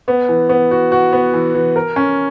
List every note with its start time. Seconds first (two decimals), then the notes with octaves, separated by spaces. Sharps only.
0.08 B3
0.29 E3
0.49 B3
0.71 F#4
0.92 F#4
1.13 B3
1.34 E3
1.55 E3
1.76 A#4
1.96 C#4